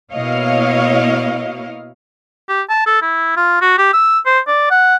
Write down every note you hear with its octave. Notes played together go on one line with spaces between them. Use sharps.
B2 A#3 E4 C#5 D#5 F5
G4
A5
A4
E4
F4
F#4
G4
E6
C5
D5
F#5